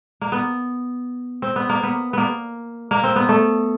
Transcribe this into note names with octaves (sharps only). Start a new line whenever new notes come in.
A#3
B3
C4
B3
A#3
B3
A#3 B3
A#3
C4
B3
A3